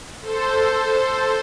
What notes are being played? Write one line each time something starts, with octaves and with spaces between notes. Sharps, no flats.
A4 C5